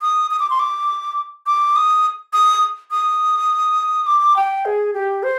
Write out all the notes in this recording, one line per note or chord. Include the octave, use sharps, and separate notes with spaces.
D#6
D#6
D6
C6
D6
D6
D#6
D#6
D#6
D6
G5
G#4
G4
C5